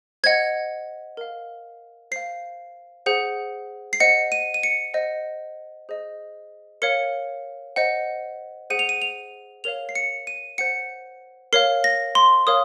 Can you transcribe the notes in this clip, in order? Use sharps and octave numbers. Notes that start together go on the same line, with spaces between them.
C5 D#5 F#5 G#6
A#4 F5
C5 F5 C7
G#4 C5 F#5
C7
C5 D#5 F#5 C#7
D#7
D#7
C#7
C5 D#5 F#5
G#4 C5 D#5
A#4 C#5 F5 C#7
C5 D#5 F#5
G#4 C5 F#5 D#7
F7
D#7
F7
A#4 C#5 F5 F7
C7
C#7
D#7
C5 F#5 C#7
A#4 C#5 F5 C7
A#6
C6
A#4 C#5 F5 D#6